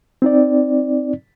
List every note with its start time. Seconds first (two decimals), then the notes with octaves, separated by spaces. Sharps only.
0.22 C4 D#4 D5